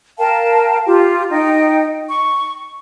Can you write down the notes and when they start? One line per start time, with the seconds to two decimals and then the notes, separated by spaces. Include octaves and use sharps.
0.18 A#4 F5 G5 A5
0.86 F4 G4
1.31 D#4 G5
2.08 C#6